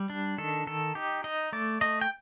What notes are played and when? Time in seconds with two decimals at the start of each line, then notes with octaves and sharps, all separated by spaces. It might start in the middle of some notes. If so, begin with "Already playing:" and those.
Already playing: G3
0.10 D4
0.38 D#3 A4
0.67 D#3 A4
0.95 D#4 G4
1.24 D#4 D#5
1.52 A3 D5
1.81 A3 D#5
2.01 G5